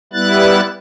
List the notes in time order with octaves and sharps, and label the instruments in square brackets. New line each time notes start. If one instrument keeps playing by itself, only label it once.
[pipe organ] G3 B3 E4 F#6 A6